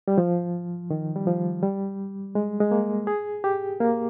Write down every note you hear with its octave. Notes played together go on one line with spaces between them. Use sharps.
G3
F3
D#3
G3
F3
G3
G#3
G#3
A#3
G#4
G4
A#3